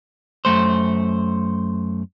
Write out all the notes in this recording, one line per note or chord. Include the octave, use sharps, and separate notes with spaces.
F#2 A3 C5